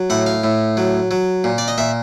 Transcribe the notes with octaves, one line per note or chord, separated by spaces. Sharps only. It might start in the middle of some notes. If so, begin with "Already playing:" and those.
Already playing: F#3
A2 F#5
F5
A2
F#3
F#3
A#2
D5
D#5
A#2 E5